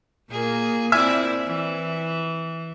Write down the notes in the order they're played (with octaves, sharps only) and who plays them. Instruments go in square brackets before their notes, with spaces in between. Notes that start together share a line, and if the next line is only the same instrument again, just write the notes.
[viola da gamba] A#2 A#3 G#4
[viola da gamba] C4 E4 D5 [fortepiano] E5 G#5
[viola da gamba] E3